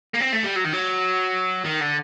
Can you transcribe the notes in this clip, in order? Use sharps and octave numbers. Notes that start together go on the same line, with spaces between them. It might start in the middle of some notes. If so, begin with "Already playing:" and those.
A#3
C4
A3
G3
F#3
D#3
F#3
D#3
D3